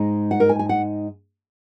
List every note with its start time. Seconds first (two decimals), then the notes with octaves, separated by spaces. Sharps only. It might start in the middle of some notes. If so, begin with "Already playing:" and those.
Already playing: G#2 G#3 D#4
0.31 F#5
0.40 A#4
0.49 G#5
0.59 G#5
0.69 F#5